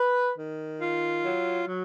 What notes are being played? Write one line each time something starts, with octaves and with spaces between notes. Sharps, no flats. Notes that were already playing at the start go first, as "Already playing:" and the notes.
Already playing: B4
D#3
F4
F#3
F#3